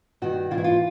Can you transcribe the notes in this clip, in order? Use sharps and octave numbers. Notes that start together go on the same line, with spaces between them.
G2 D#3 F#4
G#2 E3 E4 F4
F4